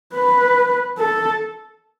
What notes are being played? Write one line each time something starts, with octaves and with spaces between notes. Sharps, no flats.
B4
A4